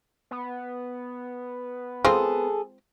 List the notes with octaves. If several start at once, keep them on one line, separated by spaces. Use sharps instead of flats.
B3
G#3 C4 F4 G#4 A4